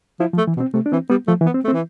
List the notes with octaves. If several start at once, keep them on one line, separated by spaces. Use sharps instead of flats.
F3 E4
F3
A3
E3
B2
C4
C3 A3
D4
E3 C4
G3 B3
F3 A3
E3
B3
C4
A3
C4
E3